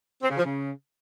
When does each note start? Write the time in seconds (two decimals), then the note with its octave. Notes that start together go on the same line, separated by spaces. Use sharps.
0.22 C4
0.30 C#3
0.37 F3
0.45 C#3